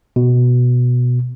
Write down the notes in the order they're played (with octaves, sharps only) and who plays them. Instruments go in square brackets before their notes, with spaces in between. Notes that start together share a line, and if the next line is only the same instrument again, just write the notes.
[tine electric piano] B2